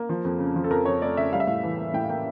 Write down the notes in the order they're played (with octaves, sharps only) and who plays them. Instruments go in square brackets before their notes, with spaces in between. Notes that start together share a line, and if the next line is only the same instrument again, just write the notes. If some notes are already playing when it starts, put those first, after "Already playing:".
Already playing: [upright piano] A#3
F3
F2
C#3
F3
A4
F2 A#4
F2 C#5
A3 D5
C#3 E5
G3 F5
E5
A2 F5
E3
A#3
A2 G5
F5
A#3 G5